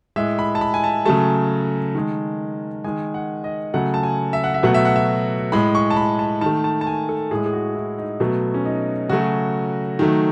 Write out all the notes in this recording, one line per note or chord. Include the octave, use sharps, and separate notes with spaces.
A2 G#3 E5
B5
A5
B5
G#5
A5
C#3 F#3 A3 A5
D#3 G#3
D#3 G#3 G#5
F#5
D#5
C#3 F#3 A3 F#5
A5
G#5
E5
F#5
E5
B2 F#3 A3 F#5
E5
F#5
E5
A2 G#3 B5
C#6
A5
B5
A5
D#3 A3 A5
A5
A5
G#5
A4
A2 G#3 G#4
G#4
F#4
E4
D#4
B2 F#3 A3
C#4
D#4
C#3 F#3 A3 F#4
D#3 F#3 A3